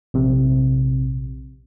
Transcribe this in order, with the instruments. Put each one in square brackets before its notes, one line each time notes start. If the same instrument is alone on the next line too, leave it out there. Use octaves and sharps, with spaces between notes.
[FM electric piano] A#1 C3